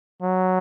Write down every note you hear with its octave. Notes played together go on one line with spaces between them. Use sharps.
F#3